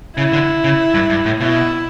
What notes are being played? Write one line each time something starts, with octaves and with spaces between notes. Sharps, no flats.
C#3 E4
D3
C#3
G2
G2
A2
B2 E4